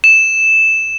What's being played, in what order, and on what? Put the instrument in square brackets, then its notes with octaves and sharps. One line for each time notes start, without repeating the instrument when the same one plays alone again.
[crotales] E7